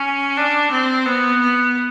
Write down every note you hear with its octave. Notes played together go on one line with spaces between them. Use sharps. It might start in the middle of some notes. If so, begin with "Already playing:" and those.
Already playing: C#4
D4
C4
B3
B3